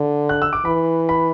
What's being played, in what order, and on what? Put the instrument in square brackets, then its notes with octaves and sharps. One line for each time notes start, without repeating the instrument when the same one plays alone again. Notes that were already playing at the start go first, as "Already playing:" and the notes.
Already playing: [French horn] D3
[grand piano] F#6
E6
D6
[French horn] E3 [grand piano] B5
[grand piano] B5